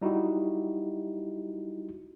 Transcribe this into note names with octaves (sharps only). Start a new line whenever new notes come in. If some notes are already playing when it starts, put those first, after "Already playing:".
G3 D#4 E4 F#4 G4